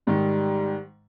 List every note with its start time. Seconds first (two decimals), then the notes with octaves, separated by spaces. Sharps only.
0.07 G#2 D#3 G3